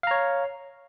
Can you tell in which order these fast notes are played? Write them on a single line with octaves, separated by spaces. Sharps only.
F5 A#5 C#5